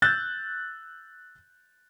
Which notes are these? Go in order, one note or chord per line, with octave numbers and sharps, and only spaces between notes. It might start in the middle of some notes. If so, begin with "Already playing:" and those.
E6 F#6 G6 A6